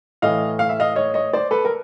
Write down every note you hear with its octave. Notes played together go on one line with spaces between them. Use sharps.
A2 E3 D#5 F5
F5
E5
D#5 F5
C#5 D#5
C#5 D#5
C5 D5
A4 B4
A#4